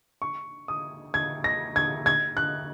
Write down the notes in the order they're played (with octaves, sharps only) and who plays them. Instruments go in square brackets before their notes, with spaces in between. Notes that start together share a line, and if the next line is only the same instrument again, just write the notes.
[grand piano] C#6
D#6
G#6
A#6
G#6
G#6
F#6